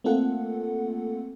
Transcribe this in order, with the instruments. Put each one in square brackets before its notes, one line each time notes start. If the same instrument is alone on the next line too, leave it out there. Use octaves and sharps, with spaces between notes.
[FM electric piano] A3 A#3 C4 F4 A4 F#5